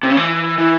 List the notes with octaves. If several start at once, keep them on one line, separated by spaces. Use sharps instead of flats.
C3
C#3
E3
E3